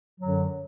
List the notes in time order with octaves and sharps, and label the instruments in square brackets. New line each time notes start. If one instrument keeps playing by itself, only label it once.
[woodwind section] F#2 D3 F#3